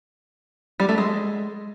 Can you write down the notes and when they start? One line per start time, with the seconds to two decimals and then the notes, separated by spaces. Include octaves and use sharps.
0.80 G3
0.89 A3
0.98 G#3